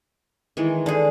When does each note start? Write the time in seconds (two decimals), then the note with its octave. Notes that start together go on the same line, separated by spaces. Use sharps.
0.57 D#3 E3 G#3
0.86 D3 G#4